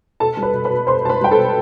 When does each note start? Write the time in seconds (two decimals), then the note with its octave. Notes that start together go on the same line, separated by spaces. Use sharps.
0.20 B2 A4 A5
0.37 G3
0.42 B4 B5
0.53 B2
0.65 B4 B5
0.70 B2
0.87 B2 C5 C6
1.05 B2 A5
1.10 B4 B5
1.21 G3 G5
1.31 A4 A5
1.37 B2